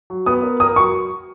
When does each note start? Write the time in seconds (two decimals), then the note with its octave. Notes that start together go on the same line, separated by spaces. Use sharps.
0.10 F#3
0.26 B3 D#6
0.43 A#4
0.60 A#4 D#6
0.76 F#3 C#6